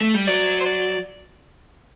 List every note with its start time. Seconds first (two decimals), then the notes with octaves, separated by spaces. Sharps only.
0.01 A3
0.14 G3
0.27 F#3 D5
0.60 C5
0.65 D5